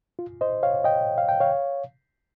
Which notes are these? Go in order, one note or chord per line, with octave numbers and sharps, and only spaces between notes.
F4
C5 D#5
C#5 F5
D#5 G5
F5
G5
C#5 F5